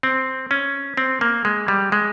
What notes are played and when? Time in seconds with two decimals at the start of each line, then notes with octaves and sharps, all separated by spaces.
0.03 C4
0.51 C#4
0.97 C4
1.21 A#3
1.45 G#3
1.68 G3
1.92 G#3